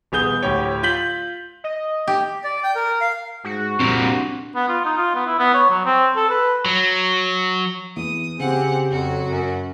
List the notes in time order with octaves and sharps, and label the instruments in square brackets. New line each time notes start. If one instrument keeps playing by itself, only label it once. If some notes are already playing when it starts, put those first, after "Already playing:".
[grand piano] D#1 B3 G#4 G6 G7
D2 A2 G4 C#5
F4 G6 B6 F#7
[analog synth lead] D#5
[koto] G4
[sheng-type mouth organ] D5
G5
A#4
F5
[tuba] G#2 [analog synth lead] F#4
[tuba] C2 [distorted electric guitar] F2 A#2 [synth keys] C4 D4
[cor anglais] B3
F4
D#4
F4
B3
E4
B3
C#5
F#3
C4
A4
B4
[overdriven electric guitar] F#3
[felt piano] E2 [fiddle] D#6
[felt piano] C#3 [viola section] C4 G4 [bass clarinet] G#4 [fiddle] F#5
[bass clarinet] F2 [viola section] F#3 [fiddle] F#4
[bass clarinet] F#2